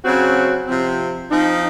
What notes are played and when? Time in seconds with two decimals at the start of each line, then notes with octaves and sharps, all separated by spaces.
0.03 C#3 F#3 C4 F#4
0.67 C3 F3 C4
1.29 F3 C4 D#4